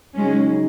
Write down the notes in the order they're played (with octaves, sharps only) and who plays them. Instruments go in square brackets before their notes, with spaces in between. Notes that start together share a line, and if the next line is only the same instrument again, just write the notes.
[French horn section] C#3 F#3 D#4 F#4 [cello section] G#3 C#4